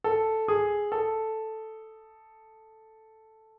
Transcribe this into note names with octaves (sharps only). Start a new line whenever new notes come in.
A4
G#4
A4